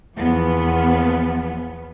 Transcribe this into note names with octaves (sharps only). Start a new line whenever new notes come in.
E2 F3 B3